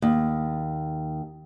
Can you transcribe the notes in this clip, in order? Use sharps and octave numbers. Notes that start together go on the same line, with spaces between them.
D#2